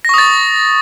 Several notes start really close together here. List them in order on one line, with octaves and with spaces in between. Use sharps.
A#6 C#6 D#6 A6